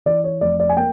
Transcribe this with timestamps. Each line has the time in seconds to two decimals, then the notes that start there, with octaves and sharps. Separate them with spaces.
0.06 E3 D5
0.24 C#5
0.41 F1 D5
0.60 D5
0.69 G#5
0.77 A#3 G5